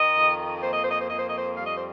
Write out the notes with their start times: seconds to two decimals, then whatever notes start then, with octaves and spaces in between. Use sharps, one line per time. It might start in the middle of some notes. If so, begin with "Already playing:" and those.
Already playing: D#3 D#5
0.15 F2
0.62 A#3 C5
0.72 D#5
0.81 C5
0.90 D#5
0.99 C5
1.09 F2 D#5
1.19 C5
1.28 D#5
1.38 C5
1.56 G3 F5
1.64 D#5
1.75 C5